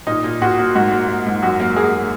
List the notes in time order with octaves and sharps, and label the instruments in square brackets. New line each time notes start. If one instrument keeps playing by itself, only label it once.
[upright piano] A#2 D#4
A#2
A#2 F#4
A#3
G#2 F#4
A#3
A#3
G#2
F#2 F#4
A#3
A#3 G#4